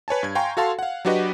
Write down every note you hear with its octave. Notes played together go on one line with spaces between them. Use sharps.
B4 C#5 G#5 A5
G2 G#6
F5 G5 G#5 A#5 C6 C#6
F#4 A4 F5 A5 C6
F5 F#5
F#3 D4 F#4 G4 B4 D#5